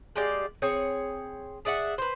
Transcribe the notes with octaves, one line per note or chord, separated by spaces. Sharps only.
G#3 G4 D5 F5
C4 G#4 C#5
G#4 D5 E5 F#5
B4 C5